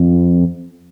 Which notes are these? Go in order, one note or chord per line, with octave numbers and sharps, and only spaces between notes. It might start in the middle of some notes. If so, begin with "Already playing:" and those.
Already playing: F2